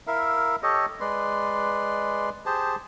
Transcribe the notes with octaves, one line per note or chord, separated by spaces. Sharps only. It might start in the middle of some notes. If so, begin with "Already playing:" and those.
E4 A#4 E5 F5
G4 A4 C#5 D#5
G#3 B4 D5 C6
G4 G#4 C5 A5